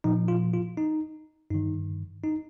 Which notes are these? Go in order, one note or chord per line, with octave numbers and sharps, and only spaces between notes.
A#2 F3 D#4
F4
F4
D#4
G2 D#3 D#4
D#4